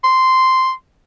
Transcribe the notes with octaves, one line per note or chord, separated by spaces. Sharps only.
C6